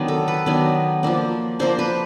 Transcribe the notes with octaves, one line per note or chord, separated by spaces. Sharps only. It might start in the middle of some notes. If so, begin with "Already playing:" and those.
Already playing: D#3 F#3 B3 D4
A4
B4
D#3 F#3 B3 D4
F3 A#3 D4
F3 A#3 D4 C5
B4